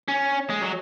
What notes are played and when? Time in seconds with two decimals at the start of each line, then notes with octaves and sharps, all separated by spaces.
0.08 C#4
0.50 G#3
0.61 F#3